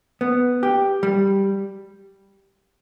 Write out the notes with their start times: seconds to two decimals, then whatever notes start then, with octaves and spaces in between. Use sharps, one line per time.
0.21 B3
0.63 G4
1.03 G3